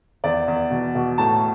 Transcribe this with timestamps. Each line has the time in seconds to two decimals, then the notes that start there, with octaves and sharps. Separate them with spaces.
0.24 E2 D5
0.48 E2
0.71 B2
0.95 B2
1.18 A2 A5